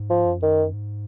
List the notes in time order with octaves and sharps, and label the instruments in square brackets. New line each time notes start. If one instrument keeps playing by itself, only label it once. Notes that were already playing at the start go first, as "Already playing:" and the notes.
Already playing: [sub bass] G#2
[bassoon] F3
[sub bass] F#2
[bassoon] D#3
[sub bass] G#2